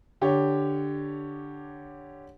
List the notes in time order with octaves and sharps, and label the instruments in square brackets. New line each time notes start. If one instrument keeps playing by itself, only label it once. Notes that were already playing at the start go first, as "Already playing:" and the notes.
[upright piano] D3 G4 C#5